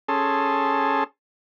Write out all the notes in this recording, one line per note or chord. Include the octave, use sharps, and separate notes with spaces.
C#4 G#4 A4 A5 C6